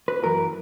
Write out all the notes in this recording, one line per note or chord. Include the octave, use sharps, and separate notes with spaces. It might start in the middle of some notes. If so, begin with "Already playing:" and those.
B4
F#2 E3 A#4